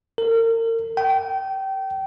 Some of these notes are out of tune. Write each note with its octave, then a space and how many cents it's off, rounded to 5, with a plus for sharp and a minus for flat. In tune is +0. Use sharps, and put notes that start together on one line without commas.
A#4 -35
G5 -25